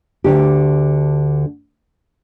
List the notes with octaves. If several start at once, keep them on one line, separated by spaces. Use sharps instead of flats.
D2 G2 D3 G4